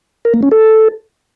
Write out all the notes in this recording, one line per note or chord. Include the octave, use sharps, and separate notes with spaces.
A#4
A#3
C#4
A4